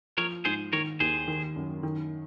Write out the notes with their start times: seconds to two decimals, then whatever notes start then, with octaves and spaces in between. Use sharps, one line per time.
0.17 F3 A#4 C#5
0.45 G#2 G#4 C5
0.73 D#3 A#4 C#5
1.00 D#2 G#4 C5
1.28 D#3
1.56 F#2
1.83 D#3